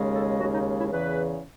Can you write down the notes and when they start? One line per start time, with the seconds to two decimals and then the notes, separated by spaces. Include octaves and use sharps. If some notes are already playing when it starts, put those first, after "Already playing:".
Already playing: D#2 C#3 G#3
0.14 A4
0.39 D#2 C#3 G#3 F#4
0.53 D#4
0.78 E4
0.91 E2 C#3 E3 B4